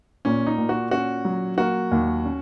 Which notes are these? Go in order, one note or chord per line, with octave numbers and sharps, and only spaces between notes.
A#2 C#4
D#4
A#2
F#4
C#4 F#4
F#3
A#3 F#4
D#2
C#4